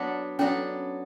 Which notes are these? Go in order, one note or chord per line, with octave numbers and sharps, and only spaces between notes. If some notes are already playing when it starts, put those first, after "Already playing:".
Already playing: F#3 B3 D4 A4
F#3 B3 C#4 D4 A4